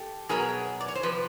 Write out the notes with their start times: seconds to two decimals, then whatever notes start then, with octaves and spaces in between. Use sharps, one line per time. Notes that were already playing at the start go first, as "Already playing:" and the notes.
Already playing: G4 A4
0.29 B2 F#3 B3 G#4 A#4
0.81 D5
0.88 C#5
0.95 C5
1.03 C3 F3 B4